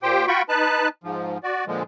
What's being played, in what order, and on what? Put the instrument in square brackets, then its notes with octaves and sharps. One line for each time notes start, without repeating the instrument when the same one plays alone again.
[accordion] A#2 G4 C5 G5
F4 F#4 G5 B5 C#6
D#4 B4 A5 F#6
G#2 F3
F#4 D5
A#2 D3 F3 G#3